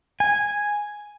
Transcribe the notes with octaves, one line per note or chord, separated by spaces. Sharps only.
G#5